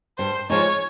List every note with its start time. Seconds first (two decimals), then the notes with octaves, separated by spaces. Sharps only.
0.18 G2 C5
0.50 F3 G#3 D#4 C#5